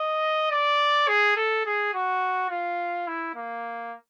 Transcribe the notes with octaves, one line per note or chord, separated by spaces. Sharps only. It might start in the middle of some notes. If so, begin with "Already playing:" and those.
Already playing: D#5
D5
G#4
A4
G#4
F#4
F4
E4
A#3